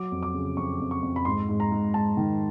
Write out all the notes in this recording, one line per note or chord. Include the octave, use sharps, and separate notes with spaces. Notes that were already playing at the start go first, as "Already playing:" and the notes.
Already playing: F#3 D6
F2
D6
C#3
F2 C#6
F2
C#6
F2
B5
G#2 C6
G#2
A#5
G#2
G#2 A5
D#3